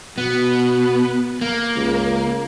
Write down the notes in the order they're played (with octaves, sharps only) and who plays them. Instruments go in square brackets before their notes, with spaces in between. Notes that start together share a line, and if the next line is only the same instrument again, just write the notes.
[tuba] B2 [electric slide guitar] B3
[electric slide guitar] A#3
[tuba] C#2